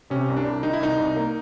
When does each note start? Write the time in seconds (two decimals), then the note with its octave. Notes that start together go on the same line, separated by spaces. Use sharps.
0.10 C3 C#4
0.28 C2
0.36 D4
0.45 C2
0.63 D#3 D#4
0.73 E4
0.80 C2 D#4
0.98 C2
1.16 A#3